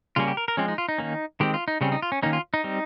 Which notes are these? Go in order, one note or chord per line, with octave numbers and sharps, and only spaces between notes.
C#3 G3 A#3 C#4 F4
G4
A#4
A#4
F3 G#3 C4 C#4
D#4
F4
D#4
D#3 A#3 C#4
D#3 G#3 C4 G4
F4
D#4
C#3 G3 C4 C#4
D#4
F4
C#4
D#3 A#3 C#4 D#4
F4
D#4
G3 C4